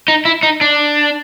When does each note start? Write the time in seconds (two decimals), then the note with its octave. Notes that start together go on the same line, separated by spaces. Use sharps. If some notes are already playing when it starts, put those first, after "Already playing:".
0.08 D#4
0.25 E4
0.43 D#4
0.61 D4